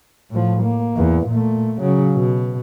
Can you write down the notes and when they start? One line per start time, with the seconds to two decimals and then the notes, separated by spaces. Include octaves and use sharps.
0.31 A2 F3
0.63 A#3
0.96 E2
1.27 A#2 A3
1.81 C#3 F#3
2.15 B2